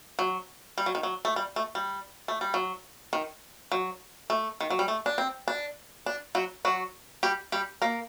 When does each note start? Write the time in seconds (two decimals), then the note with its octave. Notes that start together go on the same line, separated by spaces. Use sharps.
0.19 F#3
0.78 G3
0.86 F#3
0.95 D#3
1.03 F#3
1.25 A3
1.36 G3
1.56 A3
1.75 G3
2.28 A3
2.41 G3
2.54 F#3
3.13 D#3
3.72 F#3
4.30 A3
4.61 D#3
4.70 F#3
4.79 G3
4.88 A3
5.06 D4
5.18 C4
5.48 D4
6.06 D4
6.35 F#3 F#4
6.65 F#3 F#4
7.23 G3 G4
7.52 G3 G4
7.82 A#3 A#4